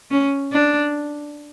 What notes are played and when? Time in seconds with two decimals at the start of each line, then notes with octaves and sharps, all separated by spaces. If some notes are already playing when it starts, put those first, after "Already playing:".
0.11 C#4
0.53 D4